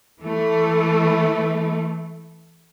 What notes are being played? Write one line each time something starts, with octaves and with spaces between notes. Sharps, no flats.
E3 A3